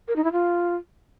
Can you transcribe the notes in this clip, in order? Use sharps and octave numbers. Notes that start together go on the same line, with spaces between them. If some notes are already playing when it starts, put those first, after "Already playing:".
A#4
D#4
E4
F4